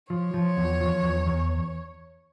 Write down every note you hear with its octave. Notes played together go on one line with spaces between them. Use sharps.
F3 C#5
F3
E2
F3
E2
E2